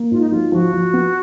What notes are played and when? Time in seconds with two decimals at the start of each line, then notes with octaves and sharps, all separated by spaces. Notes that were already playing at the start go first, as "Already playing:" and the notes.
Already playing: A#3
0.11 G#2 F4
0.21 D#4
0.30 F#3 F4
0.52 F3 F#4
0.73 F3
0.93 B3